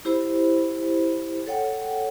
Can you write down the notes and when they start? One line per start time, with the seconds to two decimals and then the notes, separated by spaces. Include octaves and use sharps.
0.05 E4 G4 C5 B5
1.46 A4 C#5 F#5 G5